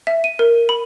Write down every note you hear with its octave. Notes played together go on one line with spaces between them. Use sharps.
E5
D#7
A#4
B5